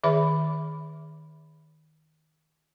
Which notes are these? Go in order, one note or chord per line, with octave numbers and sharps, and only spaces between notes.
D#3 G#4 B4 E5 B5